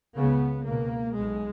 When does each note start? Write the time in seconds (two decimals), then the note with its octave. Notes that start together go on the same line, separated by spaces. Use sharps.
0.17 C#2 C#3 B3
0.67 C#2 B2 A#3
1.16 B1 B2 G#3